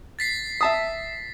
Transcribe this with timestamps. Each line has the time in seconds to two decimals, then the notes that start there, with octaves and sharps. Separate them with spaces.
0.19 A6 B6 C7
0.61 E5 A5 D#6